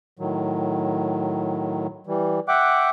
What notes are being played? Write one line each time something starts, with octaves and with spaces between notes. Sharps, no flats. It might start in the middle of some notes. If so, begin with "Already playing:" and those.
A2 D#3 F#3
E3 G3
E5 F#5 G5 D6 F#6